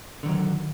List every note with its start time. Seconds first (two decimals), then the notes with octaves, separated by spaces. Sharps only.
0.23 D3
0.26 D#3
0.28 F#3